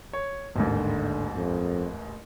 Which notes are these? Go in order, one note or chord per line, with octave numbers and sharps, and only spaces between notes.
C#5
A1 D#2 G#2 D3
F2